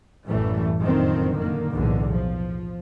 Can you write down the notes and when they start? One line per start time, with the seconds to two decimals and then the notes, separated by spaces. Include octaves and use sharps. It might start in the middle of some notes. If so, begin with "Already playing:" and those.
0.25 A1 F#2 E3 G3 A3
0.80 F#1 F2 A2 D3 D#3 C4
1.38 D3 D#3 A#3
1.72 B1 E2 A2 D3
2.10 F3